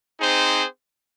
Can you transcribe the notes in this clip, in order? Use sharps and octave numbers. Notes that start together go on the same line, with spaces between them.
C4 D#4 G#4 C5